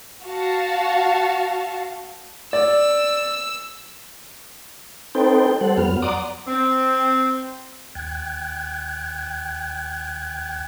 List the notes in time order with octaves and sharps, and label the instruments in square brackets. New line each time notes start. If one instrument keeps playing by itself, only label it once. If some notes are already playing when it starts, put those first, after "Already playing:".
[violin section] F#4 F5 A5
[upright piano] D5 [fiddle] E6
[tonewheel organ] C4 D#4 A4 B4 C5 G5
G3 A4 C5 F#5
F2 F#3 B3 F6
D5 F#5 A#5 C6 D6 D#6
[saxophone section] C4
[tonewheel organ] D#2 G5 F#6 G#6